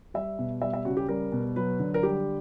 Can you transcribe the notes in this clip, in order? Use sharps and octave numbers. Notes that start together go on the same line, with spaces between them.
G3 E5
B2
G3 E5
E5
C#3 F#4
G4
G3 A#4
B2
F#3 B4
D3
A#4
G3 G4